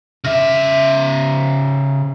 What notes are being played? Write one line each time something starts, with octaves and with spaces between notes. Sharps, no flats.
C#3 E5